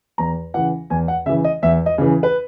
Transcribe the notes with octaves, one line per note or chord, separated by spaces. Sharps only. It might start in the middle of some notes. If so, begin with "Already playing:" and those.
E2 A#5
C#3 E3 F#5
E2 G#5
F#5
C#3 E3 E5
D#5
E2 E5
D#5
C#3 E3
B4